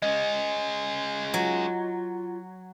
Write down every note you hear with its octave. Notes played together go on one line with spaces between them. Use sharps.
G#3 C#4 D#5
F#3 F4